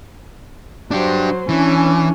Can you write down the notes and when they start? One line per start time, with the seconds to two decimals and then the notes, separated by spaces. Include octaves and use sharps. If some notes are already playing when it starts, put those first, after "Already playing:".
0.91 F#3 D4 G4 C5
1.49 E3 C#4 D4